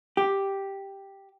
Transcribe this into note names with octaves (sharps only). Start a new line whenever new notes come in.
G4